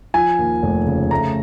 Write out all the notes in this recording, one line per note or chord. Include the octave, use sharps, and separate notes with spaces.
F3 G#5
D#2
F1
C#3
A3 A#5